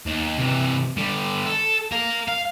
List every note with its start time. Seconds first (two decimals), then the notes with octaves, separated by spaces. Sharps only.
0.06 D#2
0.39 C3 E3
0.97 D3 G3
1.46 A4
1.92 A#4 F5
2.29 F5